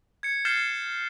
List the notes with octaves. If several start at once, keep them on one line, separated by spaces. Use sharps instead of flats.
G#6 C#7
F6 G6 A6 C7 C#7 E7